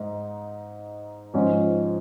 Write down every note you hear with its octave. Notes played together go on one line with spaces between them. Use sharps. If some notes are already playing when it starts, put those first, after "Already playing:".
Already playing: G#2 D#4
G#2 F3 C#4